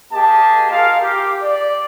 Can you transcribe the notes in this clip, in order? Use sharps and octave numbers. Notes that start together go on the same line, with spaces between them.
A#3 G4 G#4 D#5 A5
F4 G#4 A#4 F5
G4
D5